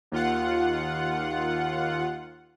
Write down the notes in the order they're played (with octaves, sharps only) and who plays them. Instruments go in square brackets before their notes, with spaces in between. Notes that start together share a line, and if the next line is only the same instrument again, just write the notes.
[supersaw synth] D#2 F4 F#5